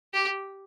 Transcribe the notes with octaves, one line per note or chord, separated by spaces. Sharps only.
G4